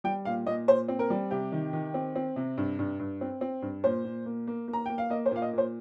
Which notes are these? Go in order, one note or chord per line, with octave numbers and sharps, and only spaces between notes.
G3 G5
A#2 F5
A#2 D#5
A#2 C5
C4
A#4
G3
C3 G4
D#3
D#3
C4
C4
C3
G2
G2
G2
C4
C4
G2
A#2 C5
A#2
A#3
A#3
A#3
A#5
A#3 G5
F5
A#3 D#5
C5
A#2 F5
D#5
A#2 C5